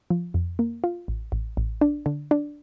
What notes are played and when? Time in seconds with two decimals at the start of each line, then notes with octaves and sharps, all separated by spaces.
0.10 F3
0.34 F2
0.59 A#3
0.84 F4
1.08 A1
1.32 A1
1.57 A1
1.81 D4
2.06 D3
2.31 D4